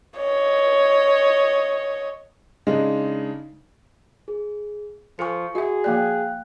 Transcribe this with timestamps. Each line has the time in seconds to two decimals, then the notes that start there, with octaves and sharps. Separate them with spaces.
0.17 C#5 D#5
2.67 C#3 G#3 D4 D#4
4.28 G#4
5.19 F3 A4 G#5 C#6 C#7
5.55 F#4 G#4 D#5 E5
5.84 F3 A#3 D5 F5 G5 F#6